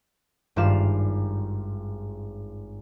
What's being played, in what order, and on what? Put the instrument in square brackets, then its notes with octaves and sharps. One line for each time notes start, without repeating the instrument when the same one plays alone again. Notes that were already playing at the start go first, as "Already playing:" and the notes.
[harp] G#1 G2 G3 F4 F5 E7